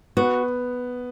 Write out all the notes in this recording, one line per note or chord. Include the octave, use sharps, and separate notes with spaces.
B3 F#4